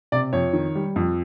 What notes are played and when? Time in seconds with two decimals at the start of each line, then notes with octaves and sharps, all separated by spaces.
0.12 C3 D5
0.33 F2 C#5
0.53 D#3
0.75 G3
0.96 F2